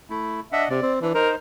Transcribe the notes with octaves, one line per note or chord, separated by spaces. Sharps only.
A3 E4
D4 D#5 E5 F#5
C3 D5
C4
E3 D4
D#4 A#4 C5